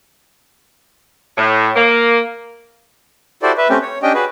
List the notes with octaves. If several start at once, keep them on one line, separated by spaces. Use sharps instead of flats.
A2
A#3
E4 F#4 G4 A4 C5 D5
B4 E5
A3 C4 C#4 G4
C#5
C#4 D4 G4 D#5 G5
F#4 G#4 B4